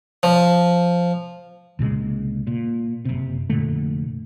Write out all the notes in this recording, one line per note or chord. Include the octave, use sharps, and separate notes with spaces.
F3
C2 A#2 C#3 G#3
A#2
F#1 C3
F1 A#2 D3 A3